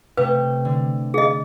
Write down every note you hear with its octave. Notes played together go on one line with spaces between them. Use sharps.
C3 A3 B4
D3
G#4 D#5